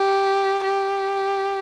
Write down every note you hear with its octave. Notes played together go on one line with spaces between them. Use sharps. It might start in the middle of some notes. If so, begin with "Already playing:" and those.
Already playing: G4
G4